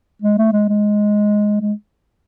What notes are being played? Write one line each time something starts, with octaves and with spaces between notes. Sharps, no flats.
G#3
A3
G#3
G#3
G#3